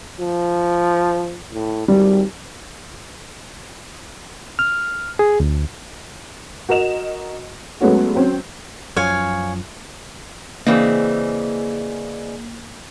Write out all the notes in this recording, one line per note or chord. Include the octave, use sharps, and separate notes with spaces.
F3
A2
G#1 G3
F6
G#4
D2
F#4 A#4 D#5 E7 F7
F#3 G#3 A3 B3 C#4 F#4
F#3 C4 C#4
F#2 F3 C#5 F5 G#5
C#3 E3 A#3 C4 G#4 D5 D#5